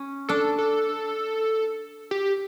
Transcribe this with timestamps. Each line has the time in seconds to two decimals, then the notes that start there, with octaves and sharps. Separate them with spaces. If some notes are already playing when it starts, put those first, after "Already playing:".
Already playing: C#4
0.29 D4 A4
0.58 A4
2.11 G4